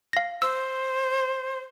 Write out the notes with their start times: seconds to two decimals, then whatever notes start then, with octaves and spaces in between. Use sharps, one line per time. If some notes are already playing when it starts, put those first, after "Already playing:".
0.13 F5 A#6
0.42 C5 E6